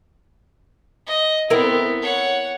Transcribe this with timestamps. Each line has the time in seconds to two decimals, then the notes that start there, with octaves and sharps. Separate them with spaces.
1.07 D#5
1.50 B3 C4 E4 A#4
2.02 C#5 F#5